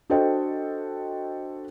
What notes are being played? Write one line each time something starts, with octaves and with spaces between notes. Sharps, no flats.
D4 F#4 A4 C5 D#5 G5